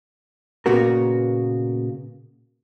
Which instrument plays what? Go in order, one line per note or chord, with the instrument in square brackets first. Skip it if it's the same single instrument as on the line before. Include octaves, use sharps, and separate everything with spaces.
[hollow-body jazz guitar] A#2 C#3 A#3 B3 F#4 A#4